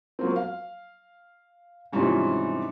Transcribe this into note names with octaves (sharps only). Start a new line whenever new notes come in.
F#3 A#3 C4
F5
G#2 C3 E3 F3 G3 C#4